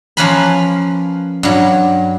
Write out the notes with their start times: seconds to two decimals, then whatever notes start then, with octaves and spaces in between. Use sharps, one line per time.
0.17 F3 A#3 C#4 B4 G#5 B5
1.43 G2 F#3